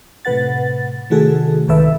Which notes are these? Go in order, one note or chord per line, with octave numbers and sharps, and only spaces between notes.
A2 C3 B4 F#5 A6
C3 D#3 A3 F#4 G#4 A4
C2 G#2 D#3 A4 B4 E5